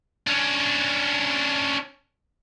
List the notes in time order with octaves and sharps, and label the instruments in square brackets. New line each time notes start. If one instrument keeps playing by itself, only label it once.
[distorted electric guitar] C#4 D4